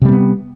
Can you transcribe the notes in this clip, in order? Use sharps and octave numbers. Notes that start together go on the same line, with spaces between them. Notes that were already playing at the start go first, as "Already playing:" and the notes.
C3 G3 A#3 B3